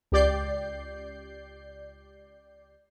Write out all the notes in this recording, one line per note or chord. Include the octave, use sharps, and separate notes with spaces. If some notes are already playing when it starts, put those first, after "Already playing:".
C#2 G4 D5 G6 C7